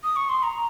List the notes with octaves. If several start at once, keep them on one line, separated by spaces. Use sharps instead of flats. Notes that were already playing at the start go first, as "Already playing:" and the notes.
D#6
C#6
C6
A#5